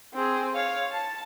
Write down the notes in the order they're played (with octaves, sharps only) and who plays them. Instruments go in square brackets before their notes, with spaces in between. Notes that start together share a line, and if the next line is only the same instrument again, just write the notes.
[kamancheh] C4 G#4
C#5 F5
A5